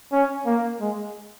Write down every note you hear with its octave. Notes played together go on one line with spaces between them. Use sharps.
C#4
A#3
G#3